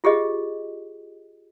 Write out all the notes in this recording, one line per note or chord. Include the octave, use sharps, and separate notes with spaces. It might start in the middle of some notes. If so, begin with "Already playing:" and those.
F4 G4 G#4 D#5